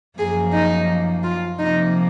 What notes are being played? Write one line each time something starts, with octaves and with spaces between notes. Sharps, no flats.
F#2 F3 A#3 G#4
D#4
F4
C3 F3 A#3 D#4